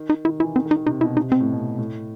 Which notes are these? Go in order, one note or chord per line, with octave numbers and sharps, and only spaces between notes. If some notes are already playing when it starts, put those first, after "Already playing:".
Already playing: D#3
D#4
D#3 E4
E3 E4
D#3 C4
D#3
D#4
D#3
C3 D#4
B2 E4
C3 D#4
B2 C4
A2
B2
A2